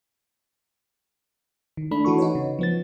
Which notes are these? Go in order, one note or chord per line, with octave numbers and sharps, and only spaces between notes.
D#3
A3 D4 B5
E3 F#4 A4 C#6
D#4 F#4 B4 C#5
C#3
F3 B3 A6